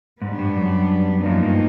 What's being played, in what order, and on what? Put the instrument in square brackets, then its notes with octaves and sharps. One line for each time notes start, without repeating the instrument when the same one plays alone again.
[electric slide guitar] G#2 [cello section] G3 B3 D4
[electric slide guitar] G2
F#2
[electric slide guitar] F#2 [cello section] A2 F3 A#3 D#4
[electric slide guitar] G2